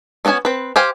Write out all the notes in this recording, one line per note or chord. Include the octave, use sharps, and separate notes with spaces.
A3 B3 C#4 F#4 G#5
C4 B4
G4 C5 F5 G5 G#5